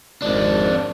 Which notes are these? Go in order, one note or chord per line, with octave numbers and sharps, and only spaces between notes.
G#1 F2 D4